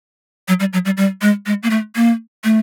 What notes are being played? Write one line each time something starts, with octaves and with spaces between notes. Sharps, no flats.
F#3
G3
F#3
G3
G3
G#3
G#3
A#3
A3
A#3
A3